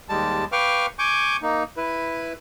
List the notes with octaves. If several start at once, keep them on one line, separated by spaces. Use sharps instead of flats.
D#2 G3 G#3 A5
B4 F5 G5 C#6 D6 F6
G#5 C#6 D6 G6
A#3 D#4
E4 B4